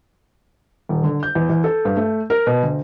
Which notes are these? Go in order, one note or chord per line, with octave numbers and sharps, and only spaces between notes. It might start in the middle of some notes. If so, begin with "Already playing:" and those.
D#1
D3
G6
E2
E2
A4
G2
A3
A#4
B2
D2